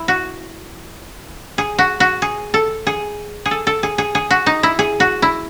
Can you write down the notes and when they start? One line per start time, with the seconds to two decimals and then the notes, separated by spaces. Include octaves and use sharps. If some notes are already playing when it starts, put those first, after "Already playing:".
Already playing: E4
0.08 F#4
1.58 G#4
1.78 F#4
2.00 F#4
2.22 G#4
2.54 A4
2.87 G#4
3.46 G#4
3.51 A4
3.67 A4
3.83 G#4
3.98 G#4
4.15 G#4
4.31 F#4
4.46 D#4
4.63 E4
4.79 G#4
5.00 F#4
5.22 E4